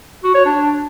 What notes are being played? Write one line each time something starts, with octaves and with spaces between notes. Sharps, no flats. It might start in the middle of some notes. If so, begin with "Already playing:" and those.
F#4
C#5
D4